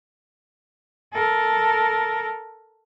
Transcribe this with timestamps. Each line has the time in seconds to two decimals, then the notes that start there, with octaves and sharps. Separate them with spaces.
1.13 A4 A#4